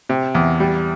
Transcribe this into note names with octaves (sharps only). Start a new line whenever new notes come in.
C3
E2
G3